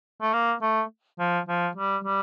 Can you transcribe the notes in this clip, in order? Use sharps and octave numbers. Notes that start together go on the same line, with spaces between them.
A3
A#3
A3
F3
F3
G3
G3